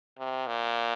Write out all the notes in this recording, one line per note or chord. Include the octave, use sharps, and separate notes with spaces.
C3
A#2